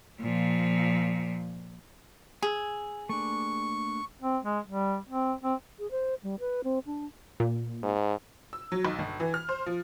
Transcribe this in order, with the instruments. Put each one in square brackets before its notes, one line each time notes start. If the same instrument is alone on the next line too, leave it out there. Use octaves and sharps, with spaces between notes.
[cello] A#2 F3
[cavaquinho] G#4 [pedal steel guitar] G#5 E6
[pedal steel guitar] A3 A#3 D4 [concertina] C#6
[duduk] C4
G#3
G3
C4
C4
[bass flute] G#4
C5
G3
B4
C4
D4
[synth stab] A#2
[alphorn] G#2
[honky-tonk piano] E6
F#3
B1
G1
E3
F6
C5
F3